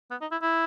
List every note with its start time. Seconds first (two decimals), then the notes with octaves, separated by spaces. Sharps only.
0.11 B3
0.21 D#4
0.31 E4
0.42 E4